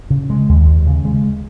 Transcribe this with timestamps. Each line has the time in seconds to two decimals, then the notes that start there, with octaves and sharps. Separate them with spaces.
0.10 C#3
0.30 G#3
0.49 D#2
0.67 D#2
0.87 C#3
1.05 G#3